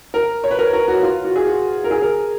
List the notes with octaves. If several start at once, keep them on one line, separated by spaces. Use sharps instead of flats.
A#4
C#5
B4
A#4
A#4
F#4
F4
F#4
G#4
F#4
A#4
G#4
A#4